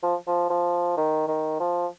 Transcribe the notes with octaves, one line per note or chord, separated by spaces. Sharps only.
F3
F3
F3
D#3
D#3
F3